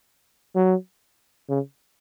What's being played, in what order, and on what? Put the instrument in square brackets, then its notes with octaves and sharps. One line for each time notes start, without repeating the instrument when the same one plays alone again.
[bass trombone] F#3
C#3